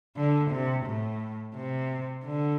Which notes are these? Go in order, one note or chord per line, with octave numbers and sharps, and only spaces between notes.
D3
C3
A2
C3
D3